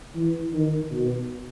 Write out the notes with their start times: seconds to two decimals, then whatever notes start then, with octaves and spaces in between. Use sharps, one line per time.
0.15 E3
0.53 D#3
0.92 B2